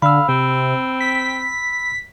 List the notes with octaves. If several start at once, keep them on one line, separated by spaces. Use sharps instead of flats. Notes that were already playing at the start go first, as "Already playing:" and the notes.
D3 F5 B5 E6
C3 C4
B6